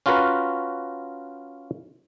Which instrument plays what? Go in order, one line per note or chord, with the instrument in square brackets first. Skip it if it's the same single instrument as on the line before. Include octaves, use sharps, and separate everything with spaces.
[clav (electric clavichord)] C#4 F4 F#4 A#4 B4